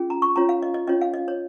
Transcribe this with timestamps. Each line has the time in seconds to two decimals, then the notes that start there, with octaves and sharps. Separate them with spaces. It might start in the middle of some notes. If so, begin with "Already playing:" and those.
Already playing: C#4 F4 G#4
0.10 A#5
0.22 C#6
0.36 C#4 F4 C#5 A#5
0.49 F5
0.63 D#5
0.74 D#5
0.87 C#4 F4 C#5 D#5
1.01 F5
1.14 D#5
1.28 C#5